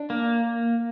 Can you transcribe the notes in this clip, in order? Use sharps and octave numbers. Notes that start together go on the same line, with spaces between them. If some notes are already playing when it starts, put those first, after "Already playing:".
Already playing: D4
A#3